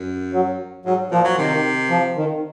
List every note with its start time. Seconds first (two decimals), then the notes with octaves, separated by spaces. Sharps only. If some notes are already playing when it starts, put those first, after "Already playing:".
Already playing: F#2
0.33 F#3
0.86 G#2 F#3
1.11 A#2 F3
1.24 F#3
1.38 C3 D#3
1.90 F3
2.17 D#3